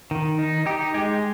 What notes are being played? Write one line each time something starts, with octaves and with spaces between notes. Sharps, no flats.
D#3
D#4
D#4 G4
G#3 G4